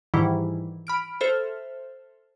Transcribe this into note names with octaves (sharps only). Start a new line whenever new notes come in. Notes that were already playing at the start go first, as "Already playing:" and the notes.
G#2 D#3 E3 G3 E4
B5 F6 D7
A4 C5 E5 F6